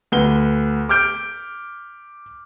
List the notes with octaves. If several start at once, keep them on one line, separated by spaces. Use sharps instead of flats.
D2 B4 G7
D6 F6 G6 D7